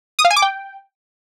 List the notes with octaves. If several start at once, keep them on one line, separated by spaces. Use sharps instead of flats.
D#6
F5
G#5
D6
G5